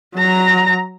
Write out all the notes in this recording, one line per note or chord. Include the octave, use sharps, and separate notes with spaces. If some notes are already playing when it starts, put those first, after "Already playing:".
F#3 A#5